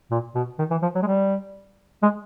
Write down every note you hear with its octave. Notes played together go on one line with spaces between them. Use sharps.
A#2
B2
D#3
E3
F3
F#3
G#3
G3
G#3